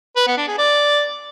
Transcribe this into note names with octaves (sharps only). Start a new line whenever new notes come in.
B4
B3
D4
G#4
D5